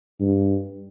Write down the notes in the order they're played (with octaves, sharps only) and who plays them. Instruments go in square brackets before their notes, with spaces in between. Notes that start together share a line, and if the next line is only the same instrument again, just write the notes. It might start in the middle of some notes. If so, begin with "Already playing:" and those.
[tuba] G2